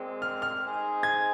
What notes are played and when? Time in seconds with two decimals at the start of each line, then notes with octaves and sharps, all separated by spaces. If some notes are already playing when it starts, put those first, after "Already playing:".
Already playing: A#2 G#3 C4
0.22 F6
0.42 F6
0.62 G#3 C4 D#4 G#4 C5
1.03 G#6